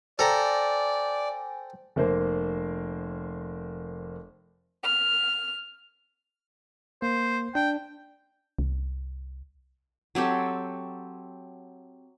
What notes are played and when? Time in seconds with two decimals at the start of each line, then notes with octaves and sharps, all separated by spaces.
0.19 A4 C5 D5 G5 G#5 A#5
1.96 F1 A#3 C5
4.84 F6
7.02 A#3 C5
7.55 D4 G5
8.59 C2
10.15 F#3 C4 G4 A4